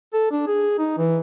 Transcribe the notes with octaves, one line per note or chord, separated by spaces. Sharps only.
A4
D4
G#4
D#4
E3